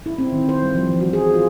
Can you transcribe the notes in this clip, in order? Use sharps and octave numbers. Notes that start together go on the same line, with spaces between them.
E4
C4
D#3
C5
G3
F3
E3
F#4
G#4
F4